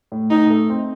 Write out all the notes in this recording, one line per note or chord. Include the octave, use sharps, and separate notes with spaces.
A2
A2 D#4
A3
C4